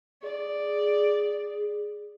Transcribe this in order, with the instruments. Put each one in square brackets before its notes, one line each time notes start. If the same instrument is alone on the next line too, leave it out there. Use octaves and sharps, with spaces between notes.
[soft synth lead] G#4 [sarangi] D5